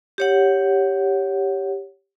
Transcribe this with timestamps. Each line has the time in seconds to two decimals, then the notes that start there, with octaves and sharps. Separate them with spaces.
0.18 G4 C#5 F#5